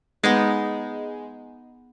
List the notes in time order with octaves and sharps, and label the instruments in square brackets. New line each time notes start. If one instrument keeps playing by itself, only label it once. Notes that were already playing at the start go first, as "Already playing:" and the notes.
[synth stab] G#3 [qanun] B3 D#4 D6